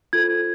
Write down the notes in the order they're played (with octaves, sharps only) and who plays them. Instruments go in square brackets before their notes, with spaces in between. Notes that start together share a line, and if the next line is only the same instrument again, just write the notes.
[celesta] F4 A4 C5 G#6